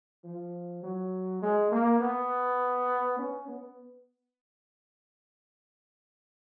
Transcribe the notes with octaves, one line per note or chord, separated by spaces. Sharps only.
F3
F#3
G#3
A#3
B3
C#4
B3